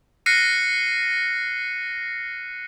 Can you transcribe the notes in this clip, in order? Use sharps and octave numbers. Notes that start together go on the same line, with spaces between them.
F6 F#6 A#6 C7 C#7 D#7